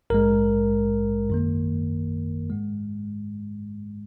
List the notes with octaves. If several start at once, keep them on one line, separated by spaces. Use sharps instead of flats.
A#1 G#2 G#3 A#4
F#2 D#3 A#3
G#2 G#3